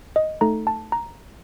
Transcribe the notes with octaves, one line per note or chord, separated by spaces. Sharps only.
D#5
A3 D#4 A4 A#5
A5
A#5